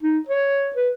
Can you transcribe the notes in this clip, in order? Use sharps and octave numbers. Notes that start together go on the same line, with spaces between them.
D#4
C#5
B4